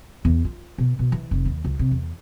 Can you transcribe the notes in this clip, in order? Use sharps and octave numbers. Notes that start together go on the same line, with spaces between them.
E2
F4
B2
B2
E3
F1
D#2
C#2
C3
E2